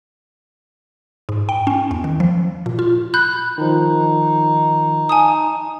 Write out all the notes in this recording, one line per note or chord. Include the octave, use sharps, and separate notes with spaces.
G#2
G5
C#4
E2
D#3
F3
A#2
F4
B5 F#6 G6
D#3 F3 D#4
G#5 A5 D#6